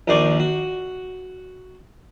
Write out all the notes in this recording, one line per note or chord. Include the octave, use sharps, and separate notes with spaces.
A#1 D#2 D#4 C5 D5 C#6
F#4